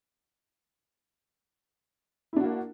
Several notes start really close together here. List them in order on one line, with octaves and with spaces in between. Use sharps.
E4 D4 F#4 A#3